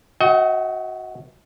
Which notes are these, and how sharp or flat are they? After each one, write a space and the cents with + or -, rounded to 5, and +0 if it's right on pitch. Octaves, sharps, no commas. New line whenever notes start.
F#4 +0 D#5 +40 G5 -40